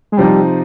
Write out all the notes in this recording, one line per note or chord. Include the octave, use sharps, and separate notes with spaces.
G#3
C3 F3 G3 C4 D#4